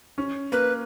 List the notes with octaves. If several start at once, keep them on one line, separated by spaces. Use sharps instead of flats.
C#4
A#3 B4